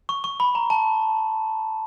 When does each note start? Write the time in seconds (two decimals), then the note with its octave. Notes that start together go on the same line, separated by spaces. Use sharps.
0.09 C#6
0.24 C#6
0.40 B5
0.55 A#5
0.70 A5